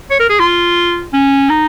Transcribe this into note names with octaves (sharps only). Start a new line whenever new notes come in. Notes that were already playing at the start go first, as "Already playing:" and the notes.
C#5
A#4
G#4
F4
C#4
D#4